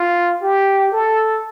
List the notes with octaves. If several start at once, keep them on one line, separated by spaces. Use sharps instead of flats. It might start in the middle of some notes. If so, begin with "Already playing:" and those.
Already playing: F4
G4
A4